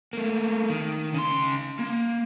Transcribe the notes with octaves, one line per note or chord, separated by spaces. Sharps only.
A3 A#3
D#3
C#3 C6
A#3